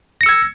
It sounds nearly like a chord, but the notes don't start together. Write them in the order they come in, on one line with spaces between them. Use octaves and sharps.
A#6 C#7 E6 G#6